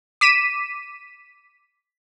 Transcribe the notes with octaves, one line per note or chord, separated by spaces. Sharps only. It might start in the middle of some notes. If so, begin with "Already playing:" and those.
D6 B6 D#7 E7